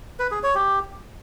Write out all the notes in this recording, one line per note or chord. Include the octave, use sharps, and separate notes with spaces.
B4
G#4
C#5
G4